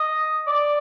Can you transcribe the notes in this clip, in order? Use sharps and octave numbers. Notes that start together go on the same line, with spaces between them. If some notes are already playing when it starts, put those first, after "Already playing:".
Already playing: D#5
D5